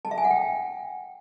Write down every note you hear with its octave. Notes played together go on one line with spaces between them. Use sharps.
A5
E5
G#5
F#5
G5